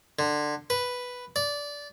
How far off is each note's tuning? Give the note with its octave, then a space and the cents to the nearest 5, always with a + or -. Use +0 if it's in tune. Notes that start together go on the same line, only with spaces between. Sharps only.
D3 +20
B4 +0
D5 -15